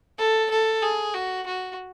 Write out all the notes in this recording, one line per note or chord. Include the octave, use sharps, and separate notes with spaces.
A4
A4
G#4
F#4
F#4